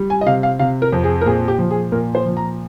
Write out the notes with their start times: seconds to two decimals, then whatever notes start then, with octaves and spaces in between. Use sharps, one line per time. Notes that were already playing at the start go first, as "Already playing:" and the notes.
Already playing: G3
0.10 G#5
0.21 D#5
0.26 C3 F5
0.43 F5
0.59 C3 F5
0.82 A#4
0.93 F2
1.04 G#4
1.21 A#4
1.26 A#2 G#4
1.48 G4
1.59 F3
1.70 G#4
1.92 A#2 A#4
2.15 C5
2.26 F3
2.37 A#5